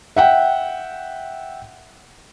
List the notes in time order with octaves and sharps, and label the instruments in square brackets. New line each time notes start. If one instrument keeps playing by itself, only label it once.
[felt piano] E5 F#5 G5